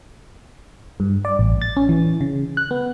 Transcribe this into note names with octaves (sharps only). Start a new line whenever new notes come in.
G2
D5
A1
A6
C#4
E3
C#3
F#6
B3